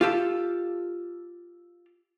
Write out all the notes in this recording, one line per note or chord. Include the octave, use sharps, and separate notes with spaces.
F4 G4 A4